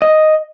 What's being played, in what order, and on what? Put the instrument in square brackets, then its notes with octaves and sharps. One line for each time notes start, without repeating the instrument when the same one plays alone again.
[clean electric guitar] D#5